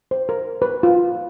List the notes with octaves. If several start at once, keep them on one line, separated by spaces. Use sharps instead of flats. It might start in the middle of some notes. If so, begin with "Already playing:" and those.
C5
A#4
B4
F4